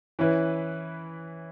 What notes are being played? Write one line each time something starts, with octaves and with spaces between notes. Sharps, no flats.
E3 C#4 E4 B4